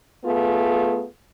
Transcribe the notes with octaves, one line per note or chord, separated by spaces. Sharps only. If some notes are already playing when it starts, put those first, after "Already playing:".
A3 B3 F4 G#4